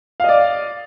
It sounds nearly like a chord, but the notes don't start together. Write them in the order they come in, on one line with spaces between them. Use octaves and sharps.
F5 D#5 D5